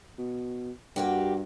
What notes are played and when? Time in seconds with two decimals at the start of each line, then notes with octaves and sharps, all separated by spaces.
0.18 B2
0.96 G2 A#3 F#4 G4